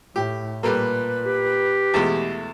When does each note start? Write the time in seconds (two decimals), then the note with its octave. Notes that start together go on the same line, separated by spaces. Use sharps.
0.16 A2 G4
0.63 A#2 G3 A3 A#3 B4
1.26 G4
1.94 E2 B2 G#3 A3